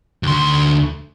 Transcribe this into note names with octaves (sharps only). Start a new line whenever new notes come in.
D2 C6